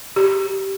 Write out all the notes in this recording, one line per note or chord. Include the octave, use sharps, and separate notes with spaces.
G4